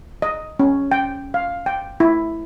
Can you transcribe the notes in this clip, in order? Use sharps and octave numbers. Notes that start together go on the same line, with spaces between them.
D#5
C#4
G5
F5
G5
E4